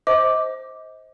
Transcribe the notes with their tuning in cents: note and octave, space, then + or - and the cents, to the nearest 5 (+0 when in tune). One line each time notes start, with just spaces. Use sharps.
C5 +0 D#5 +35 D6 +0